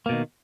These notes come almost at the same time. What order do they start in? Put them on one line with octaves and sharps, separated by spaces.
A#3 B2 D#3